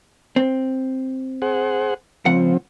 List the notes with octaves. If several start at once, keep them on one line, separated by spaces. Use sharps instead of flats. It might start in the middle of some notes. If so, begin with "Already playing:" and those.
C4
G#4 C5 F#5
C#2 F3 C4 F#5